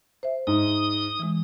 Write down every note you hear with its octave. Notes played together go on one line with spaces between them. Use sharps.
C5 E5
G#2 D#6
E3 G#3